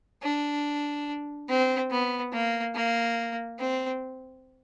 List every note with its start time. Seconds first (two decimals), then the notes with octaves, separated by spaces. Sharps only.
0.22 D4
1.49 C4
1.91 B3
2.32 A#3
2.75 A#3
3.58 C4